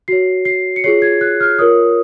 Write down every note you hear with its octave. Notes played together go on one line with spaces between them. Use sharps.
F#4 C#5 C7
C7
C#7
F4 G#4 C#5 C7
G#6
F#6
F6
F4 A#4 C#5 D#6